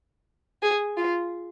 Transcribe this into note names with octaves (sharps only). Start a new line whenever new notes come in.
G#4
F4